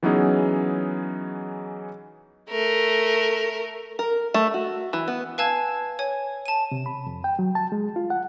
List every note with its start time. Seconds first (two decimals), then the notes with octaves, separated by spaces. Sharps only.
0.03 E3 F#3 B3 C#4 D#4 G#4
2.50 A3 A#4
3.99 A#4
4.34 A3
4.54 F#4
4.93 E3
5.08 B3
5.38 B4 F5 G#5 A5 E6 G#6
5.99 C#5 G#5
6.46 A5 D#7
6.72 C3
6.86 B5
7.06 F2
7.24 G5
7.39 F#3
7.55 A5
7.72 G#3
7.96 F4
8.10 F#5